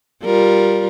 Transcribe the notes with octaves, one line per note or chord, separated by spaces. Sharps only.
G3 F4 A#4